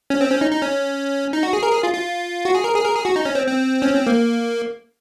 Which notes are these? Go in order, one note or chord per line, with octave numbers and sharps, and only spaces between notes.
C#4
C4
C#4
D#4
D#4
C#4
D#4
F#4
G#4
A#4
G#4
F4
F4
F#4
G#4
A#4
G#4
A#4
G#4
F#4
D#4
C#4
C4
C4
C#4
C4
A#3